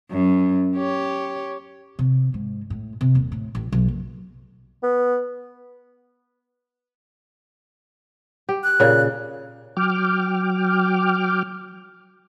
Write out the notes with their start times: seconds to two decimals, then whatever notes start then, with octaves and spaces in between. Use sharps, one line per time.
0.11 F#2
0.76 G4 C#5
1.99 C3
2.34 G#2
2.70 A2
3.01 C3
3.15 D#1
3.32 A2
3.55 A1
3.72 B1
3.88 F#1
4.83 B3
8.49 G4
8.64 F#6
8.80 A#2 C#3
9.77 F#3 G5 D6 F6